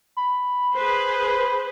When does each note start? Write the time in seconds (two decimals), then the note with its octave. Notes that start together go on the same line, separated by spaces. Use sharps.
0.17 B5
0.74 G#4 B4 C5